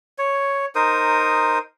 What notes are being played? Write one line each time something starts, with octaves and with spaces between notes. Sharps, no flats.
C#5
D#4 A#4 C5 D#6